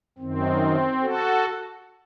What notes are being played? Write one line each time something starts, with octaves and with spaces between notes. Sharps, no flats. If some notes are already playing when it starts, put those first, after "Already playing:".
F#2 D#3 C4
F#4 A4